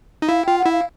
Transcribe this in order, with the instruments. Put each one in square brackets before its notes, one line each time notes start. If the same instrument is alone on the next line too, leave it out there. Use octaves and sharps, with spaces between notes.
[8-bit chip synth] D#4
[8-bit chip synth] E4 [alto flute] F5
[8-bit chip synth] F4 [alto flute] G5
[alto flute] F#5
[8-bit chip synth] E4
[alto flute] F5